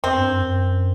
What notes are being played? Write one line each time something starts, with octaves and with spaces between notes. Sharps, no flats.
E2 C4
G2
F#2
F#2